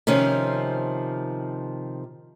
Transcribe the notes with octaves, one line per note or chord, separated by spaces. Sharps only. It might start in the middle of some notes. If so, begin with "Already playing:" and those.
C3 D#3 F3 C#4